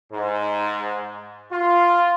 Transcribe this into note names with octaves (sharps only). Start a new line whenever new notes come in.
G#2
F4